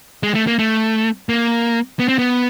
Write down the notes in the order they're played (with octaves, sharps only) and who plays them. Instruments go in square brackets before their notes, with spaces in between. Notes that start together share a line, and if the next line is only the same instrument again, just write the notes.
[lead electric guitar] G#3
A3
A#3
A3
A#3
B3
C4
B3